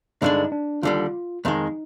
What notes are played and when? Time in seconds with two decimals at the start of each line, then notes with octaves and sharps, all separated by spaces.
0.22 G2 D3 G#3 D4 D#4
0.52 D4
0.83 D#2 D3 G3 F4
1.45 F2 D#3 G#3 D#4